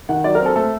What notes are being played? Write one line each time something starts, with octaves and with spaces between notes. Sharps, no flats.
D#3 F#5
F#3 D5
A#4
C4
A4
A3 A4